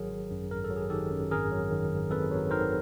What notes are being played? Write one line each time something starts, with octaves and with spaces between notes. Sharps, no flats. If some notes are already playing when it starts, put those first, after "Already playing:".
Already playing: G#1 F#3 G#4 A#4
D#3
F#2
G#1 A#4
A4
F#3
G#4
D#3 G4 A4
F#2
G#1 G#4 A#4
F#3
D#3
G#2
G#1 A4 B4
F#3
D#3 A#4 C5